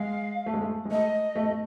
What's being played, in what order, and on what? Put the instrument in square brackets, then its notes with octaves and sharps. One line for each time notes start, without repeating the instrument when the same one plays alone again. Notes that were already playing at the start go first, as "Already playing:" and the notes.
Already playing: [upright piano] G#3 [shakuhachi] F5
[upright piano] A3
G#3
A3
G#3
[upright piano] A3 [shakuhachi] D#5
[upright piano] A3
A3